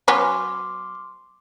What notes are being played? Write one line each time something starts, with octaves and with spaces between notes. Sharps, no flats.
F#3 B3 C#4 C6 D6 F6